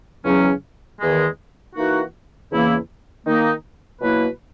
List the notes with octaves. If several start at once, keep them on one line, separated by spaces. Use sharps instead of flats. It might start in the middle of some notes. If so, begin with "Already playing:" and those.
E2 C#3 F#3 C#4
E2 D#3 G#3
E3 A#3 D#4 F#4
E2 C#3 E3 A#3 E4
D#3 A#3 D#4
B2 F#3 A#3 E4 B4